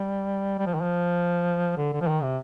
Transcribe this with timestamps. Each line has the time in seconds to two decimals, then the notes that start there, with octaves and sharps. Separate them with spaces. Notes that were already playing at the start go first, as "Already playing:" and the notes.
Already playing: G3
0.58 G3
0.66 F3
0.74 D#3
0.82 F3
1.77 D3
1.93 D3
2.01 F3
2.07 D#3
2.22 C3